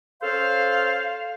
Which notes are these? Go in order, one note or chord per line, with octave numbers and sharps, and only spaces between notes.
C#4 A4 C5 F5